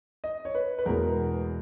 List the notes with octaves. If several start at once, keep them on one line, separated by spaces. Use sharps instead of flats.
D#5
C#5
B4
B4
E2 B2 G#3 A#4